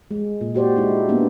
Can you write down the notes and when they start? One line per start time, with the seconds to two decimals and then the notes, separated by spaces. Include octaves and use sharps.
0.11 G#3
0.41 A#2
0.54 F#4 G4 C5 D5
0.76 G#3 D#4 E4
1.09 A#3 B3 D4